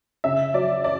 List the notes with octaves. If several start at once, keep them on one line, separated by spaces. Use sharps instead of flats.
C#3 E5
F#3 D5
D5